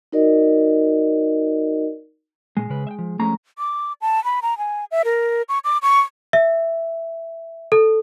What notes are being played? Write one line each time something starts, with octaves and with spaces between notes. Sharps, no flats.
D#4 F#4 A#4 D5 D#5
A#2 G#3
C#3 B4
E5 G5
F3
F3 G#3 A3 C#4 A#5
D6
A5
B5
A#5
G#5
E5
A#4
C#6
D6
C#6
E5
A4